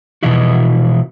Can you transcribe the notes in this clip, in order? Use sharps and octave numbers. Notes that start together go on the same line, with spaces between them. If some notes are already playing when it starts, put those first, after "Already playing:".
B2 E3 F3 E4 F#4